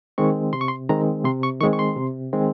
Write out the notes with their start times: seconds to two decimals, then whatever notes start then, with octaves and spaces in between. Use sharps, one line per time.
0.18 D#3 G#3 C4 C#6
0.53 C3 C6
0.61 C#6
0.68 C6
0.89 D#3 G#3 C4 A#5
1.24 C3 C6
1.43 C#6
1.61 D#3 G#3 C4 C#6
1.73 C#6
1.79 C6
1.96 C3
2.33 D#3 G#3 C4